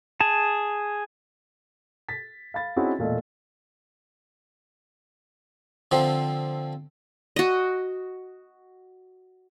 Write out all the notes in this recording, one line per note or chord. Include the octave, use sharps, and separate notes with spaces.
G#4 A5
A6 B6
F5 B5 A6
C4 C#4 D#4 E4 F#4 G#4
E1 A#2 A3 A4 D#5
D3 F3 C4
F#4 D#5